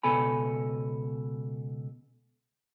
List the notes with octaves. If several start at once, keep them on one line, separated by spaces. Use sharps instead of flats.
C#2 B2 A4 G#5 B5